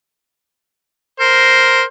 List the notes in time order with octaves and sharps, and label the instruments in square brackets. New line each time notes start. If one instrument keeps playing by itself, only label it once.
[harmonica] A#4 C5